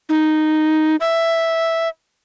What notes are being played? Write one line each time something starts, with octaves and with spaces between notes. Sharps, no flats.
D#4
E5